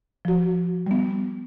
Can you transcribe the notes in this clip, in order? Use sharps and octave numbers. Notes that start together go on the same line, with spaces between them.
F3 F#4
G3 B3